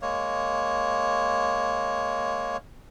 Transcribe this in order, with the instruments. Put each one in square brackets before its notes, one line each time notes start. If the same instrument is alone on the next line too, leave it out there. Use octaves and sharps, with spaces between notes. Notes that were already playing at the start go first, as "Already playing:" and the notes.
[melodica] G#3 A#3 C#5